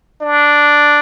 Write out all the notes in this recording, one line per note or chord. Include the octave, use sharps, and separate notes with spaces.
D4